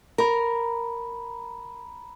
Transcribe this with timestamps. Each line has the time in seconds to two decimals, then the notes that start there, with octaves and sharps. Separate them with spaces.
0.18 A#4 A#5 B5